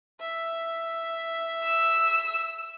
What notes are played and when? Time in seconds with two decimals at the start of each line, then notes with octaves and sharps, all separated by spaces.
0.20 E5
1.64 E6